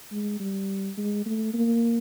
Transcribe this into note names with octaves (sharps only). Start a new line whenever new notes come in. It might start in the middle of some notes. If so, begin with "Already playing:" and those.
G#3
G3
G#3
A3
A#3